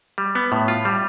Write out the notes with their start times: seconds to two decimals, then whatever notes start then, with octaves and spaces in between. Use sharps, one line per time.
0.18 G3
0.35 B3
0.52 A2
0.68 F4
0.85 G3